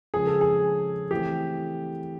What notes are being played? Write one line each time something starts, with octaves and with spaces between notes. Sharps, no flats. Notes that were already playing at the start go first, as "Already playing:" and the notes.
C#3 F3 G#3 G#4
A4
G#4
E3 A3 C4 G4